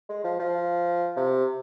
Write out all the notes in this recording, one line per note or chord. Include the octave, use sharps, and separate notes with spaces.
G#3
F3
F3
C3